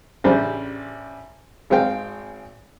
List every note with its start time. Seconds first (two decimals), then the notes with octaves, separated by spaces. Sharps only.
0.24 A1 C#3 G3 D4 C5
1.70 G#1 G#3 C4 F5 G5